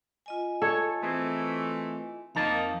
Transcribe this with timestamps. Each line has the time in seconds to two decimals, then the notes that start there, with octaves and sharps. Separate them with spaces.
0.26 F4 D#5 G#5
0.62 A4 C#5
1.02 E3 A3 C4 G#4
2.35 F2 F3 A#3 D#4 F5 A5